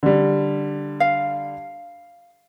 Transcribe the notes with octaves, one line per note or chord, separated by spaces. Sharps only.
D3 G3
F5